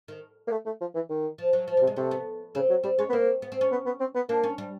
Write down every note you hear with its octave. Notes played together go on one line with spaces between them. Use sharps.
D#3
A#3
A3
A3
F3
E3
D#3
F3
F#3
F3
G3
C3
G#3
C3 A3
B3
C#3 C4
F#3
G3 C4
G#3 C#4
B3
A#3 C4
B3
C4
C#4
B3
B3
C4
B3
A#3 D4
C#4
G3